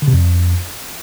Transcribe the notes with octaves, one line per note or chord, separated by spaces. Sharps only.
D3
C3
F2